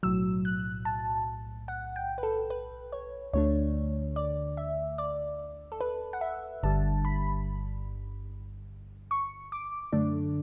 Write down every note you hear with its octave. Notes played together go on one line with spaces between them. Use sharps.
B1 A2 F#3 E6
F#6
A5
F#5
G5
B4
A4
B4
C#5
D2 D3 A3 D4 C#5
D5
E5
D5
A4
B4
F#5
E5
G1 G2 D3 G3 A5
B5
C#6
D6
F#2 D3 A3 D4